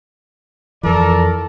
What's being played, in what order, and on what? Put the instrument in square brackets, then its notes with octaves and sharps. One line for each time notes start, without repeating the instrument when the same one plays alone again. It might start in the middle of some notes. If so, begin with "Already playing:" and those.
[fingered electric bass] F2 E3 [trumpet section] A4 A#4 D5